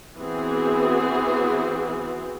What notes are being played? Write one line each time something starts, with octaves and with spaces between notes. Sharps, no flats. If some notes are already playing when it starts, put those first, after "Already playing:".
E3 B3 C4 F#4 G#4